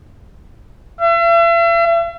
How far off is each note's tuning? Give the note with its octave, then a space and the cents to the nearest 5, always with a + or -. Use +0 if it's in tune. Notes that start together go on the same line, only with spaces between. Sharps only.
E5 +45